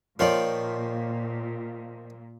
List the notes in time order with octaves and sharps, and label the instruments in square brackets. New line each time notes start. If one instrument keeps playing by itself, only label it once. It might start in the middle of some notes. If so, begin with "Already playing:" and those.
[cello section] A#2 [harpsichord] D#3 F3 F4 [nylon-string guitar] C#5 D5